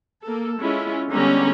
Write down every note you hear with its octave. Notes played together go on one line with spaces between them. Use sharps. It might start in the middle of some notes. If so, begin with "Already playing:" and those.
A#3 A4
G#3 C#4 E4 F4
D3 G3 G#3 B3 C#4 A#5